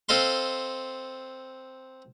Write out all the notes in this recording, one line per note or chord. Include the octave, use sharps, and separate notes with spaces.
C4 A4 D#5 F5 C6